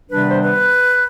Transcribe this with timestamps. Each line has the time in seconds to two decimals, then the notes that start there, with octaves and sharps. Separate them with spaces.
0.10 C3 D#3 G3 B3 D4 B4
0.29 C5
0.40 B4